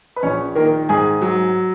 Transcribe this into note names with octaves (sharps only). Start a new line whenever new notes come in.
B4
A#1 C#4 C#5
D#3 A#3 A#4
G#2 G#4 G#5
F#3